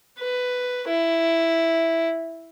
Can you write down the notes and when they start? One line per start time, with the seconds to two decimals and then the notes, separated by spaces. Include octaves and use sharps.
0.19 B4
0.88 E4